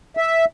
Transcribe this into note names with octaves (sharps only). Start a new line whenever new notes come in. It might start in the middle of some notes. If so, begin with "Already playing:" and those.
E5